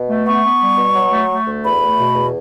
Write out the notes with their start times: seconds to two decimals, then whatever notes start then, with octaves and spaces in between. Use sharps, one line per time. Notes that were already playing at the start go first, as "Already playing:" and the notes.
Already playing: B2
0.09 A3
0.26 B3 C#6
0.43 B3
0.60 G3
0.78 B2
0.95 F#3
1.12 A3
1.29 A3
1.46 D2
1.63 E2 B5
1.81 A3
1.97 B2
2.15 E2